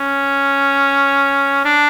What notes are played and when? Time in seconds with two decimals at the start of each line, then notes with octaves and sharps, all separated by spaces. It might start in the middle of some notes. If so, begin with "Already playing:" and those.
Already playing: C#4
1.65 D4